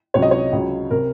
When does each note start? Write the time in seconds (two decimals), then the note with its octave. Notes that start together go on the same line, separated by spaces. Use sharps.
0.14 C#2 C3 F#3 C#5
0.22 D#5
0.31 C#5
0.52 C#2 C#3 F#3
0.91 C3 A#4